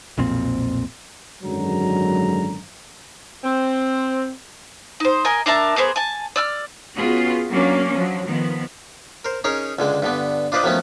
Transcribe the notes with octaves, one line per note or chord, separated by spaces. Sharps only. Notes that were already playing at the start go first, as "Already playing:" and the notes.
B1 F2 A#2 C4
G#1 F#2 D3 F#3 G#3 A#5
C4
D#4 C5
A#4 D#5 G#5
D4 A#4 E5 A5
A#3 B3 G#4 C5
G#5 A5
D5 E6 F6
B3 C#4 F4 F#4 G#4
F#3 A#3 C#4 D4
F3 F#3
D#3 F3 B3
A#4 C5
C#4 D#4 G#4 A#4 C#5
C#2 D3 G#3
G2 D3 B3
D4 F4 B4 C5 D5 D#5
D#3 F3 F#3 A3 B3 C#4